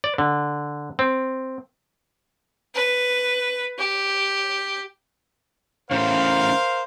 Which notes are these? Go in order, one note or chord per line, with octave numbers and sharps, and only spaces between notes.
D5
D3
C4
B4
G4
C#3 E3 A3 A#4 C5 F5